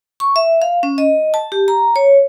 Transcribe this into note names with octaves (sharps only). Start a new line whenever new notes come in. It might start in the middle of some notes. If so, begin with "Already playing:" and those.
C#6
E5
F5
C#4
D#5
A5
G4
A#5
C#5